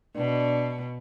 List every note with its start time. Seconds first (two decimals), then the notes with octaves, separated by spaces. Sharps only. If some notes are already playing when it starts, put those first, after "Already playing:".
0.16 B2 D4